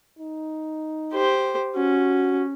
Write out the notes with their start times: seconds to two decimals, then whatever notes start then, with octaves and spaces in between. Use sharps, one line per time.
0.19 D#4
1.13 G4 C5
1.76 C#4 F#4